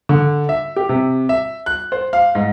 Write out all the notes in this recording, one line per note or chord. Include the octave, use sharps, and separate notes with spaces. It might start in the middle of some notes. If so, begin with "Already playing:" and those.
D3
E5
G4
C3
E5
F#6
C5
F5
G#2